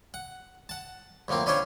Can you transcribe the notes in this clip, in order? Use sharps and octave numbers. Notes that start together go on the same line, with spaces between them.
F#5
F#5 A5
D2 A2 F3 A#3 C4
C#4 D4 E4 F4 C5 C#5